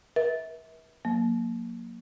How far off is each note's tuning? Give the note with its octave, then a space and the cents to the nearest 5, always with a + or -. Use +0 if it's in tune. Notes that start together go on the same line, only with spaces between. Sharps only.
B4 -45 E5 -35
F#3 -25 A#3 +0